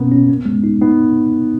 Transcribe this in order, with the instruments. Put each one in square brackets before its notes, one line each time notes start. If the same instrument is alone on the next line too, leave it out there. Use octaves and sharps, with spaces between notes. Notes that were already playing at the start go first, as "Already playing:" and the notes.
Already playing: [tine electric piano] B2 C#4 [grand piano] A#3 B3
[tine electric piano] C#4
B3
G#3
D#4
[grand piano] B3 [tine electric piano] D#4